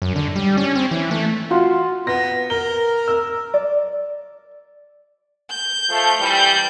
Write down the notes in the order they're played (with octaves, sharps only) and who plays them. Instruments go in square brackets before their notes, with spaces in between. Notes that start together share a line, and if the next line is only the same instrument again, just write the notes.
[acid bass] F#2
D3
G3
C#4
C4
E3
A3
[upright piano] F4 F#4 C6
[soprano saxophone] B3 [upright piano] A#6
[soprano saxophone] A#4 [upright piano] G7
[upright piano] E6
[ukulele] D5
[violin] G6
[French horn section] F3 A3
[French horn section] E3 G3 [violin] G6